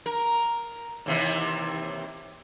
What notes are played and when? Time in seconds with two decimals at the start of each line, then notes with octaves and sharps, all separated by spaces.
0.06 A#4
1.06 D#2 C3 E3